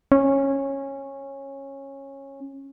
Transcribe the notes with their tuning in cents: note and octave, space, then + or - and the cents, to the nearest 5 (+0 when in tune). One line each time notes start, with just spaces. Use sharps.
C#4 -15